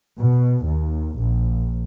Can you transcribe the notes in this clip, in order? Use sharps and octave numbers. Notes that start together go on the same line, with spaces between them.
B2
D#2
A#1